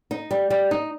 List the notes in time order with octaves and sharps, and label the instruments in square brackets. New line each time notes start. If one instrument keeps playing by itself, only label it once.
[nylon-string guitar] D#4
G3
G3
D#4